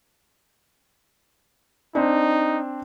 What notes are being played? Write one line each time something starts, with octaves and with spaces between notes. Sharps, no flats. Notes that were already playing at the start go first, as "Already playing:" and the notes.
C4 D4 D#4